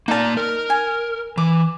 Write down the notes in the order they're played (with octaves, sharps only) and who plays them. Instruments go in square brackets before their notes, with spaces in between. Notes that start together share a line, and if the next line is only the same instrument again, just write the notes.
[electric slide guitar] A#3 D5 [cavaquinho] D#4 A5
[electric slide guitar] A#4
[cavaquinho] G#5
[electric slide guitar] E3 [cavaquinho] D6